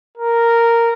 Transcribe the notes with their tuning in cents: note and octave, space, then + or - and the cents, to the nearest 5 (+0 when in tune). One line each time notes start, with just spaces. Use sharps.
A#4 -5